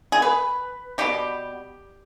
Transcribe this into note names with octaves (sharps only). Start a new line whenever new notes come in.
G#4
B4
B2 G3 B3 G4